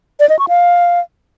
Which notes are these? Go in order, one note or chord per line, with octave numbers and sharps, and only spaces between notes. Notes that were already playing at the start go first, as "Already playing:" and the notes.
D5
D#5
C#6
F5